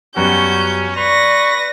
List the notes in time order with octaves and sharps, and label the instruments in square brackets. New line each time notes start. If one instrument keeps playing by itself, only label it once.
[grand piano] F#2 G3 B3 [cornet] C#4 [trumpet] F#4 [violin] G6
[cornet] B4 [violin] D5 A#6 [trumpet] C#6 [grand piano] F7